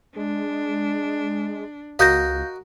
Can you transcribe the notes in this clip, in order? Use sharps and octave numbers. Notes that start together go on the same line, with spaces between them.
G#3 D4
C#2 F#4 A#4 D#5 F5 G6 A#6